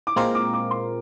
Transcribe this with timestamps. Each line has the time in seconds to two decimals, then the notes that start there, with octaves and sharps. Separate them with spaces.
0.07 D6
0.16 A#2 G#3 C4 F4 A#4 C6
0.35 D6
0.54 D6
0.71 C6